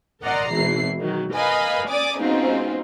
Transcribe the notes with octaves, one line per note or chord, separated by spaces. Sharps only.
A#4 D5 D#5 F#5 A#5 C6
G#1 B2 E3 E4 C7
D#3 F#3
A#4 B4 D#5 F5 G#5 B5
C#4 D5 G#5 D6 D#6
G#2 B2 C4 C#4 D#4 F4